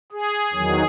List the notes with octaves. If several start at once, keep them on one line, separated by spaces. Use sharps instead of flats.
G#4
E2 D#3 F#3